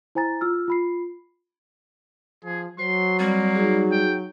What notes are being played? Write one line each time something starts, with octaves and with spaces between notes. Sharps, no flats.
E4 C5 G#5 A#5 A6
F4 E6 F6
F4 B5 C7
F3 G#4
F#3 F#4 C5 C6
G3 A#3 C4
D#4 F#4 G#4
G5